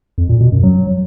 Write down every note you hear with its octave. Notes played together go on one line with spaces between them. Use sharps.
F2
A#2
B2
F#2
F#3